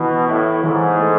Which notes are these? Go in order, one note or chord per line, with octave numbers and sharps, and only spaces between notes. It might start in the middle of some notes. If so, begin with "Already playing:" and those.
Already playing: B2 E3
A2 E4
G#2 E3
A3